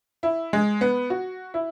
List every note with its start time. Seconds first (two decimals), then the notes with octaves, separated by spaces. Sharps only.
0.23 E4
0.53 G#3
0.81 B3
1.10 F#4
1.54 E4